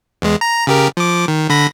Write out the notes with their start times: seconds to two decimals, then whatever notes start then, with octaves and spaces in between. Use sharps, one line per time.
0.22 E2 G#3
0.41 A#5
0.67 C#3 G4 A#4
0.97 F3 D6
1.28 D#3
1.50 D3 B5 A#6